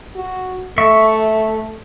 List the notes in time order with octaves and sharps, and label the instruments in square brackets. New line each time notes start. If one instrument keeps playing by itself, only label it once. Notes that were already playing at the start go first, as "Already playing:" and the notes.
[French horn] F#4
[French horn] A3 [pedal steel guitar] E5 C#6